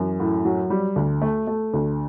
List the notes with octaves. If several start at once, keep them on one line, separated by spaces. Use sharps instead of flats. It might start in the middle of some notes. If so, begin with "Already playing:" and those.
Already playing: F#2 E3
A2
F#3
G3
D2
A3
A3
D2